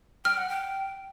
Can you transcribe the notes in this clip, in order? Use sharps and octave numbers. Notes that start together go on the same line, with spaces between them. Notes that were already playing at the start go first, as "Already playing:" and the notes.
G5 F6
F#5
G5